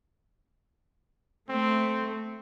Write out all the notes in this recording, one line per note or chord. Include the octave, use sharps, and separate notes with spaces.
A3 C4